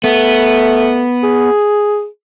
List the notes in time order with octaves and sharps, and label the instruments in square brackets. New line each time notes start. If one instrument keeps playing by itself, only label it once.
[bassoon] A3 [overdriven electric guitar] B3
[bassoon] G#4